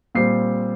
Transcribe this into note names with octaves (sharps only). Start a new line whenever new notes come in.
A#2 G3 C4 C7